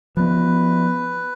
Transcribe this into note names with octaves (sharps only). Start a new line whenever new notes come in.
F3 B3 B4